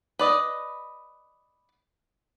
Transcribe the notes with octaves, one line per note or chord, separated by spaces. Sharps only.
B4 D5 D#5